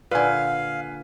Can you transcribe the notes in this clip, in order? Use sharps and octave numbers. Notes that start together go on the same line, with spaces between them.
A#2 D3 B4 F5 G#5